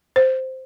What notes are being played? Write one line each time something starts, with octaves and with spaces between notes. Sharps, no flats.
C5